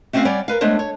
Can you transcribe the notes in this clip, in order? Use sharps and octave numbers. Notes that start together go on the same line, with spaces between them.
A3 C4 C#4 F#4 E5 F5
G3 C#5 D5 F#5 G#5
A#4 B4 F5
G#3 A3 B3 D4 C5 C#5
C#5